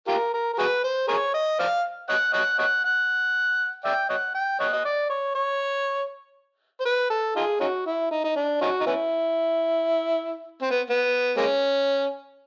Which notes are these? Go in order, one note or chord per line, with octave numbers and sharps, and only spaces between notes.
F4 G4 A#4
A#4
A#4
F#4 G#4 B4
C5
G#4 A#4 C#5
D#5
C5 D5 F5
C#5 D#5 F#5
C#5 D#5 F#5
C#5 D#5 F#5
F#5
D5 E5 G5
C#5 D#5 F#5
G5
C#5 D#5 F#5
D#5
D5
C#5
C#5
C5
B4
A4
D#4 F4 G#4
C#4 D#4 F#4
E4
D#4
D#4
D4
C#4 D#4 F#4
D#4
B3 C#4 E4
C4
B3
B3
G#3 A#3 C#4